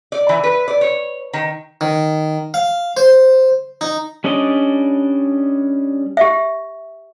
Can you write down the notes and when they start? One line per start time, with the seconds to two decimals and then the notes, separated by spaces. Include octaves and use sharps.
0.12 D5
0.29 E3
0.44 B4
0.68 D5
0.81 C#5
1.33 D#3
1.81 D#3
2.54 F5
2.97 C5
3.81 D#4
4.24 G3 C#4 D4 D5 D#5
6.17 G4 E5